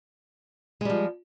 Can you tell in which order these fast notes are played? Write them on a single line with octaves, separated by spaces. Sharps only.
G#3 G3 F3